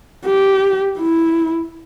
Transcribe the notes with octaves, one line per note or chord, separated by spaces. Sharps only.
G4
E4